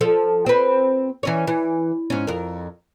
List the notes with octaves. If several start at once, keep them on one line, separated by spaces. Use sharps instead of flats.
F3 A4
C4 B4
E3 C#4 C#5
E3
G#2 C#4
F2 A#4